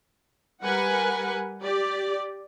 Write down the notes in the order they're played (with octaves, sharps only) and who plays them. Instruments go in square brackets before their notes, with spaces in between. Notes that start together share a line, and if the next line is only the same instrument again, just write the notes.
[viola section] G3 A#4 B4 F#5 G#5
G4 D5